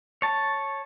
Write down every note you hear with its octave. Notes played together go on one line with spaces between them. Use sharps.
C#5 A5